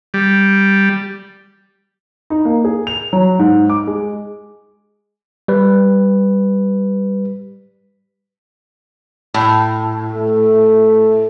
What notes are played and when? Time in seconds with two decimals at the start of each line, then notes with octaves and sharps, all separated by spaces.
0.14 G3
2.30 D#4
2.45 A#3
2.65 G#4
2.87 F7
3.13 F#3
3.39 G#2
3.70 D6
3.87 G#3
5.48 G3 B4
9.34 A2
10.15 A3